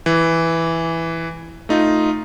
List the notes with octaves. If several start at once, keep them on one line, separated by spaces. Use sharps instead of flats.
E3
A3 D#4 F4